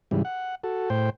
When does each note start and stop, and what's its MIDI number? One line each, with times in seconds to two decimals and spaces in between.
0.11 0.23 44
0.11 0.23 49
0.11 0.23 52
0.11 0.23 55
0.25 0.55 78
0.64 0.90 66
0.64 0.90 69
0.90 1.10 45
0.90 1.10 72
0.90 1.10 79